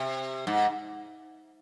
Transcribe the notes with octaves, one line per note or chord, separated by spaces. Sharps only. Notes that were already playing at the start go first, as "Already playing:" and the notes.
Already playing: C3
G#2